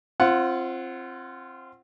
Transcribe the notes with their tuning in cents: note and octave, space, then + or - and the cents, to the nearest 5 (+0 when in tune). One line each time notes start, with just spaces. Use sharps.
C4 +20 F4 -20 F#5 +0